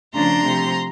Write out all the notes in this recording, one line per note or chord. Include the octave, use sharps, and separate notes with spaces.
C#3 F3 A3 D4 A#5 C6
C3 F3 A3